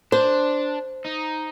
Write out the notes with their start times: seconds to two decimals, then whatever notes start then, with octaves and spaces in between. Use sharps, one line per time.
0.12 D4 C5
1.06 D#4